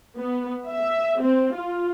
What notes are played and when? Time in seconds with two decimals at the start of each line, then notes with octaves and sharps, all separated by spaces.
0.17 B3
0.68 E5
1.21 C4
1.55 F4